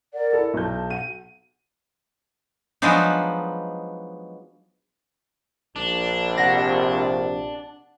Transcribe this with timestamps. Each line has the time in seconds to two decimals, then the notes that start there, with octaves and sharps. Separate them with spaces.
0.13 A#4 D5 F#5
0.33 E4 A4
0.54 B1 A5 G6
0.90 F#5 D#7
2.82 F3 F#3 G#3 B3 D4 D#4
5.76 A#1 D4
6.37 C3 F#5 A#6